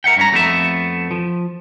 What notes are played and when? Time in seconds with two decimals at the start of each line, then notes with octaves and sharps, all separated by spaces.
0.04 A#4 E5 F#5 G5
0.17 G2 C#4 A#5
0.32 F2 A3 B3 F4 E5
1.11 F3